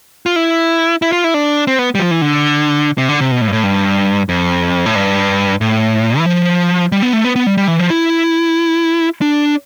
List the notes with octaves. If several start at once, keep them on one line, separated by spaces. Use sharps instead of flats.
F4
E4
E4
F4
E4
D4
C4
B3
G3
F3
E3
D3
C3
D3
C3
B2
A2
G2
A2
G2
F2
A2
G2
A2
E3
F3
G3
B3
A3
B3
B3
G3
G3
E3
F3
E4
D4